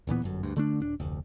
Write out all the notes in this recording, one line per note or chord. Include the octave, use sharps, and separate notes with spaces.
D1 A#2 E3 B3
G1 F#2
D2 G2
D3 A3 D4
D#1 D4
F1 D2